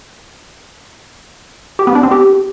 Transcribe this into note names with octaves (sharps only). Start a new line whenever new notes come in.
G4
B3
D4
C4
G4